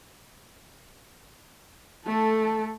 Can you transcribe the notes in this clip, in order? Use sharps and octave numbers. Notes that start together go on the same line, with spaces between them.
A3 A4